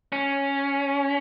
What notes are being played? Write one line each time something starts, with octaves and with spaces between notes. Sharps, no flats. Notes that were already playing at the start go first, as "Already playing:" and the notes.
C#4